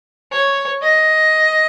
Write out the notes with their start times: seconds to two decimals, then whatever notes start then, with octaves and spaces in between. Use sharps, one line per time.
0.32 C#5
0.83 D#5